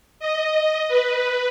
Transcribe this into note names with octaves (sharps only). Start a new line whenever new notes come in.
D#5
B4